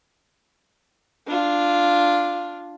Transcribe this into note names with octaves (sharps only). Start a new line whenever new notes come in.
D4 F4